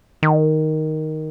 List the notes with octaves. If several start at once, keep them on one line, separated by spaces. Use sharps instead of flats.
D#3